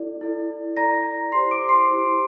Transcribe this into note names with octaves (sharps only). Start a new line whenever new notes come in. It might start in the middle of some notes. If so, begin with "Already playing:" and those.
Already playing: E4 A4 D5
E4 A4 D5
E4 A4 D5 A#5 A#6
E4 G4 C5 C6 C7
D6 D7
C6 C7
E4 G4 C5